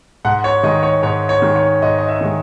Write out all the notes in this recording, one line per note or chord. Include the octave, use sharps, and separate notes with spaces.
G#2 F#5
C#5
D#3 G#3 D#5
C#5
G#2 C#5
C#5
D#3 G#3
C#5
G#2 D#5
D#5
E5
D#3 G#3